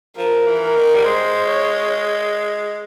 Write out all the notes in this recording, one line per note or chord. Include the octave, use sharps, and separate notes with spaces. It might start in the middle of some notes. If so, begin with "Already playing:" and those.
F3 A#4
E3
A#4
D#3
G3
G#3 C5
C#5